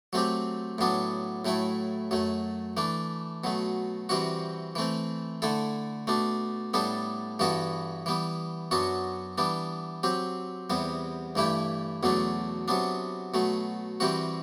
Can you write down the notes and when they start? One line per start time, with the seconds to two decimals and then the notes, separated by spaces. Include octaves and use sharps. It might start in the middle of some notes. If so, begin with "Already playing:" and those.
0.13 F#3 A3 C4 G4
0.78 A2 F#3 B3 D4
1.45 A2 F#3 A3 E4
2.11 F#2 F#3 A3
2.77 E3 A3 D4
3.44 B2 F#3 A3
4.09 C3 E3 G3 C4 F#4
4.75 E3 A3 C4
5.42 D3 A3 E4 A4
6.07 B2 A3 D4
6.74 A2 G3 B3 D4 A4
7.39 G2 E3 B3 F#4 A4
8.06 E3 G3 B3
8.71 F#2 F#3 B3 D4 F#4
9.38 E3 G3 B3 D4
10.03 F#3 C4 G4
10.70 E2 C3 G3 B3
11.36 G2 E3 A3 E4 G4
12.03 E2 B2 F#3 A3 D4
12.68 C3 F#3 B3 D4
13.34 B2 F#3 A3
14.00 C3 E3 G3 C4 F#4